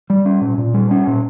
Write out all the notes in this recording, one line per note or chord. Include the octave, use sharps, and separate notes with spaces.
G3
C#4
A#2
A#2
G3
C#4
A#2